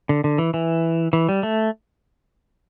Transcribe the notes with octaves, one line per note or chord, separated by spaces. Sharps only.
D3
D3
E3
E3
E3
G3
A3